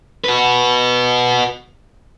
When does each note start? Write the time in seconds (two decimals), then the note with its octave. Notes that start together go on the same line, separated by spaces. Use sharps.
0.24 F#4 B4